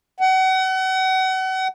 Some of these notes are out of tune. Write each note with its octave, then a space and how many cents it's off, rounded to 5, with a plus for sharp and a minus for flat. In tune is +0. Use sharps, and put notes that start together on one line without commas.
F#5 +35